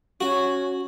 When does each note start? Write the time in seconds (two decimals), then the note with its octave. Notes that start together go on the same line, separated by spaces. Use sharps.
0.21 C#4 F#4